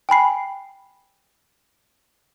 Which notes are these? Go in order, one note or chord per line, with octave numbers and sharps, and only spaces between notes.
G5 G#5 B5 C7